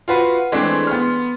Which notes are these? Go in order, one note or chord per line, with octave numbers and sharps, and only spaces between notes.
F4 F#4 B4
E3 G#3 A3 C4 D4
B3 C6 F6